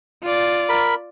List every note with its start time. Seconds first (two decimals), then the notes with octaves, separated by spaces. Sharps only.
0.23 F4 D5
0.69 A#4 B5